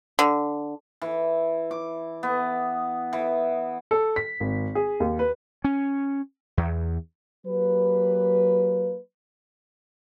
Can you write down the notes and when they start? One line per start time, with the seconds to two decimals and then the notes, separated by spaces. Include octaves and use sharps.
0.19 D3
1.02 E3
1.71 D6
2.23 B3
3.13 E3
3.91 A4
4.16 B6
4.40 G#1
4.75 G#4
5.00 D#2
5.19 B4
5.64 C#4
6.57 E2
7.46 F#3 A#3 G4 B4